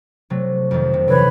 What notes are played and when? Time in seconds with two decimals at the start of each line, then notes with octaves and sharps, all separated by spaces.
0.30 C3 F#3 A3
0.71 F2 D#3
0.94 C3
1.08 D2 C3 E3 B4 C#5